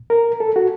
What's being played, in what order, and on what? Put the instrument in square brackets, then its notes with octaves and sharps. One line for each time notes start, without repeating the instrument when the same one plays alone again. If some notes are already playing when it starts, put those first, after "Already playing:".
Already playing: [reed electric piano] A#2
A#4
A4
F#4